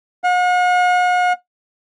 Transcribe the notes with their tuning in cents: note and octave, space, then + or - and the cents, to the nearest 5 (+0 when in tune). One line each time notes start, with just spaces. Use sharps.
F#5 -45